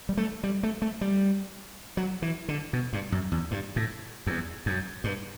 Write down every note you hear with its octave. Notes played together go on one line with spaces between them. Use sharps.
G3
A3
G3
A3
A3
G3
F#3
E3
D3
B2
G2
F#2
E2
G2
A2
E2
F#2
G2